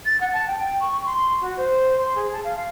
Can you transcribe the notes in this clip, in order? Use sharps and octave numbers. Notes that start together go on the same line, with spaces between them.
A6
F#5
A5
G5
C#6
C6
F#4
C5
C6
G#4
A5
F5